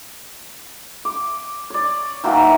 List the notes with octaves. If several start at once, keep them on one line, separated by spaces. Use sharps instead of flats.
D6
C#5 D5
D#3 E3 F#3 A#3